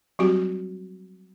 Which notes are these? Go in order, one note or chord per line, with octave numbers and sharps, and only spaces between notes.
F#3 G3 C4 F#4 G4